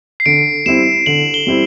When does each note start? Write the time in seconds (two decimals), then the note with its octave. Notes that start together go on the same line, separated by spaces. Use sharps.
0.20 C7
0.26 D3 D7
0.66 G3 C4 E4 E7
1.06 D3 F#7
1.34 G7
1.47 G3 C4 E4